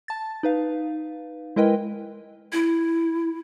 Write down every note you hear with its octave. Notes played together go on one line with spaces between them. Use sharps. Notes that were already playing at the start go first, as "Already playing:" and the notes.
A5 A6
D#4 B4 F5
G#3 E4 A#4 B4 D#5 G5
E4